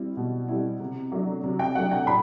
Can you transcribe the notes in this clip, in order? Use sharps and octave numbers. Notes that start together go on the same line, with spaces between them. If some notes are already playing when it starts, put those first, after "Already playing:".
Already playing: G3 C4 E4
B2
G3 C4 E4
C3
F#3 A3 D4
C3
G5
F#3 A3 D4 F#5
G5
A2 B5